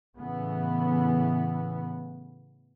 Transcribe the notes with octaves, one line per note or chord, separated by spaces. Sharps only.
A2 C#3 E3 B3